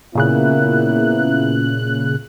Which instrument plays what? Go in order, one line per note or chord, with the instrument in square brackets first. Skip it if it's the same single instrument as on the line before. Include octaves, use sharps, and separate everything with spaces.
[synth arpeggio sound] A#2 C#3 F#6 [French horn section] A#3 B3 E4